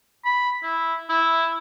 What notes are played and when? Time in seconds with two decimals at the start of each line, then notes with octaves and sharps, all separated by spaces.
0.25 B5
0.63 E4
1.09 E4